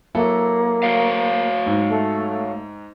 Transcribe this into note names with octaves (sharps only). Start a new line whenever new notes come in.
F#3 A#3 E4 A4
F#4 C#5 F5
G#2
A3